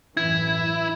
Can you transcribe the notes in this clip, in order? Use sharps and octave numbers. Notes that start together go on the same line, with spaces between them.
A1 F#2 E3 E4 G#6